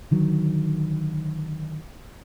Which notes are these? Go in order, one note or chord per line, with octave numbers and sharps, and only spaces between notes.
D3 D#3 F#3